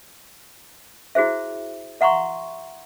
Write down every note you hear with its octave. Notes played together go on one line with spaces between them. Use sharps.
E4 F#4 G#4 C5 E5
E5 F#5 A#5 C6 C#6